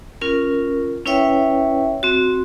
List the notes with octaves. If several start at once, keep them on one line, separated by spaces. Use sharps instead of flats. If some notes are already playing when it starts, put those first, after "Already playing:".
C#4 F4 A#4
C#4 E4 B4 C#5 E5 G5
C4 F#4